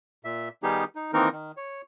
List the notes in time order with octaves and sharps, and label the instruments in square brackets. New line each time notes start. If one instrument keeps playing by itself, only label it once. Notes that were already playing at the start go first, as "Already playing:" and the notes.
[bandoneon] A#2 E5
D#3 G3 B3 D#4 G4 G#4
D#4
D#3 E3 A#3 C4 D#4 A#4
D#3
C#5